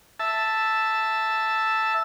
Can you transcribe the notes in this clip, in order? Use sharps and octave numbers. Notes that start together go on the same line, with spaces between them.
E5 A5